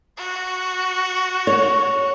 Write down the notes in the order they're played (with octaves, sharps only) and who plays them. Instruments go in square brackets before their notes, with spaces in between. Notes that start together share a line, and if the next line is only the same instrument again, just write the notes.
[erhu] F#4
[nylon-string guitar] C#5